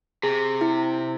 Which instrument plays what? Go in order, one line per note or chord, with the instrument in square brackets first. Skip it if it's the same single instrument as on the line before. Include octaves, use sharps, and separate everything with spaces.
[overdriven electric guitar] C3 [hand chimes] G#4
[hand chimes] E4
E4